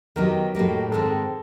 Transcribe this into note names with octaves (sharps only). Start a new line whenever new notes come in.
D#3 F#3 B3 D#4 G4 A#4
A2 F#3 A#3 D#4 G4
G#2 D#3 G#3 C4 A4